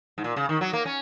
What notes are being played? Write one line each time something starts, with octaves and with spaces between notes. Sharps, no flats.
G#2
A#2
C#3
D#3
F#3
A#3
C#4